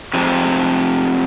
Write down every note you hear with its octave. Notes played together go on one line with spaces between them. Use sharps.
F2 C3 F3 G#3 C4